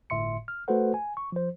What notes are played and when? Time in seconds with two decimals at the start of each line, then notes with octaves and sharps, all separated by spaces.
0.10 G1 A2 E5 C6 C#7
0.48 F6
0.68 A3 F#4 A4 B4 C5 F#5
0.94 G#5
1.17 C#6
1.32 F3 C5